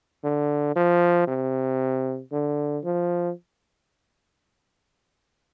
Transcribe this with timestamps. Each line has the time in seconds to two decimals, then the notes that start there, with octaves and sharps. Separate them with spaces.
0.24 D3
0.76 F3
1.27 C3
2.32 D3
2.84 F3